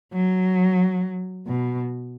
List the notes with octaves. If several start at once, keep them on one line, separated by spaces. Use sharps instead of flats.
F#3
B2